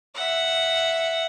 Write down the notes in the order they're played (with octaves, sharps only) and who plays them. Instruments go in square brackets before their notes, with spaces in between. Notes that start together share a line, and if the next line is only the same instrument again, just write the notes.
[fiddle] E5 F#5